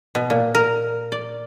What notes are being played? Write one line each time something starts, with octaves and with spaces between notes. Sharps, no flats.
B2
A#2
A#4
D5